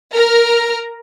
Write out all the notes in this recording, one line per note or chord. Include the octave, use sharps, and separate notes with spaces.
A#4 A#5 F6